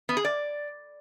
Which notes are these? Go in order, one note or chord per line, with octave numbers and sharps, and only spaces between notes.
B3
G#4
D5